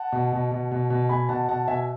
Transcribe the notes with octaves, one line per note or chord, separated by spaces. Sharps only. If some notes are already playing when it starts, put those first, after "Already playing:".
Already playing: F#5 A5
B2
B2
B2
B2
B2
B2 G#5 B5
B2 F#5 A5
B2 F#5 A5
B2 E5 G#5